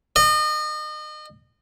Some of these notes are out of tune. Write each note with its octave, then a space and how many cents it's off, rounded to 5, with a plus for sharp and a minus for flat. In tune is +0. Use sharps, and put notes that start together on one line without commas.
D#5 -35